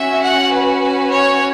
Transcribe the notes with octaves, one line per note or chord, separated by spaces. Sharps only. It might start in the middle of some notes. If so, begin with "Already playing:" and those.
Already playing: C#4 F#4 E5
F#5
B4
B4
C#5